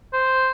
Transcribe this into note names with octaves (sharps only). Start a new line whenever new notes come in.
C5